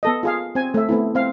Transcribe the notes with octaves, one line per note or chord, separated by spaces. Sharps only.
B3 A4 D#5
F4 G#4 F5
C4 G#5
A3 E5
A3 B3 C4 E4
C4 F5